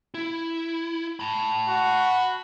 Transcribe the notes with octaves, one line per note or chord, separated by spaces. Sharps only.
E4
A5 B5
F#4